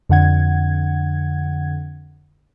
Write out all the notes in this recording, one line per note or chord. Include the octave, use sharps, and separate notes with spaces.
F2 D3 F#5 G#6